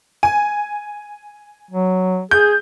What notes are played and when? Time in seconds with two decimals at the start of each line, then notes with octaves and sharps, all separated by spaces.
0.23 G#5
1.71 F#3
2.31 G#4 G6